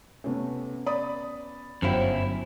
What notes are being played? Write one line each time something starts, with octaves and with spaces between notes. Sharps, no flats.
C3 A3 B3 C#4
D5 B5 D#6
G1 F#2 F#3 E4 C5 E5 F5 G5